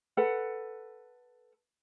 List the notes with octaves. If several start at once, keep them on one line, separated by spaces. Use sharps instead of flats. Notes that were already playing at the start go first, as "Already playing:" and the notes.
A4 B4 F#5